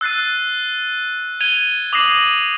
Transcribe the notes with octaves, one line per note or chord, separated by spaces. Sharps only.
E6 F#6 A6 C7 D#7
G#6 D#7 F7 G7
D6 D#6 G#6 A#6 C7 E7